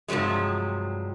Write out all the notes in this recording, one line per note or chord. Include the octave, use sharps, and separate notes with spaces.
G2 C3 F3 F#3 G#3